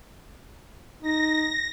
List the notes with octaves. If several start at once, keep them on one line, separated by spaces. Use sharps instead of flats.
D#4 A#6